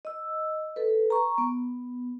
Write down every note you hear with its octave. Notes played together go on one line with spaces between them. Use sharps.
D#5 E6
A4 B4
A#5 C#6
B3